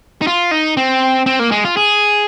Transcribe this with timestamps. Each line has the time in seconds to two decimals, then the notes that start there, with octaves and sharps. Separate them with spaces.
0.21 D#4
0.27 F4
0.51 D#4
0.77 C4
1.26 C4
1.39 A#3
1.51 G#3
1.65 F4
1.77 G#4